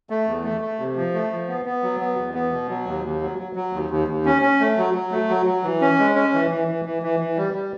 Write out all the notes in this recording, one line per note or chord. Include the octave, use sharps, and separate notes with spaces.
A3
E2
A3
A3
C3
F3
A3
F3
B3
B3
F#3
B3
E2
B3
B2
F#3
D#2
D#2
F#3
F#3
F#3
D#2
D#2
D#2
C#4
C#4
A3
F#3
F#3
A3
F#3
F#3
E3
C#4
G#3
C#4
E3
E3
E3
E3
E3
E3
G3
G3